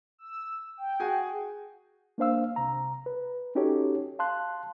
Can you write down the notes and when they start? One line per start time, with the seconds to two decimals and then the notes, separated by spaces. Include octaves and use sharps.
0.19 E6
0.77 G5
1.00 F#4 G#4 G#5
2.18 A#3 D4 C5 F5 E6
2.56 C2 C3 A#5
3.06 B4
3.55 C#4 D#4 F#4 G4 A4 C#5
4.19 F5 A5 C6 F#6